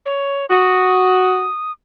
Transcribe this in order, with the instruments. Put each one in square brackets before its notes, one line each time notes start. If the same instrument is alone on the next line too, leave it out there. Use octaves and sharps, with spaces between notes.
[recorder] C#5
[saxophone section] F#4 [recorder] D#6